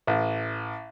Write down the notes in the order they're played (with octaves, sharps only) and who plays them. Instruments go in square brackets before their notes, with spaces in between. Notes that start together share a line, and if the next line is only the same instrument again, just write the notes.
[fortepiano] A1